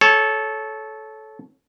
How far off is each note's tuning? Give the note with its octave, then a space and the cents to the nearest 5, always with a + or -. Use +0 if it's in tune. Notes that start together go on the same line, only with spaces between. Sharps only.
A4 -20 C#5 +0